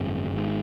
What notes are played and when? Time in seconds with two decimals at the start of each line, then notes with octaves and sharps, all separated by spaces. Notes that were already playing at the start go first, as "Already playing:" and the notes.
Already playing: G#1 F#2 C#3 B3
0.32 G#1 G#2